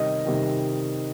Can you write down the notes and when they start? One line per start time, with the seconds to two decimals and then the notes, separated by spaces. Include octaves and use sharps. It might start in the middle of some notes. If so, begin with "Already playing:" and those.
Already playing: C3 D#3 G3 D#5
0.25 C3 D#3 G3